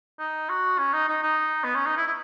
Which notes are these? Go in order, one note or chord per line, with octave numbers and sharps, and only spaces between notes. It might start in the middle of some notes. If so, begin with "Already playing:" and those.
D#4
F#4
C#4
D#4
D#4
D#4
B3
C#4
D#4
E4
E4